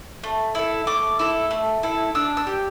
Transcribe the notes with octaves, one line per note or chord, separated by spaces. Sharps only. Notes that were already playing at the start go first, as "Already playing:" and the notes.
A3
E4 A4
A3 D6
E4 A4
A3
E4 A4
D4 E6
E6
G4